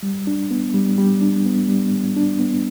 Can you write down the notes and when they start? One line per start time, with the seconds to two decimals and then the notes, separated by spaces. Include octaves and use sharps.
0.03 G3
0.27 D4
0.51 B3
0.74 G3
0.98 G3
1.22 D4
1.45 B3
1.68 G3
1.92 G3
2.17 D4
2.40 B3